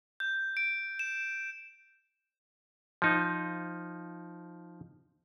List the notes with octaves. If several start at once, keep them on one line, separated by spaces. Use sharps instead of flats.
G6
D7
E7
F3 D#4